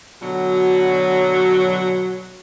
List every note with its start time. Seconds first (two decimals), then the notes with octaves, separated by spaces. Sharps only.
0.22 B2 D3 F#3